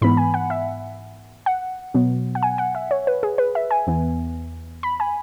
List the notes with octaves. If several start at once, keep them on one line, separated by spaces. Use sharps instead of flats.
G#2 E3 B3 B5
G#5
F#5
E5
F#5
B2 F#3 B3
F#5
G#5
F#5
E5
C#5
B4
G#4
B4
E5
G#5
E2 E3 B3
B5
G#5